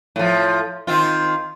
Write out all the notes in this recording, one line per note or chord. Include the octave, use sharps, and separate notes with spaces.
A2 F3
D#3 C4 F4